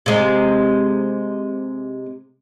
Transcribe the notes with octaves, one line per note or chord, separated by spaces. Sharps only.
C3 G#3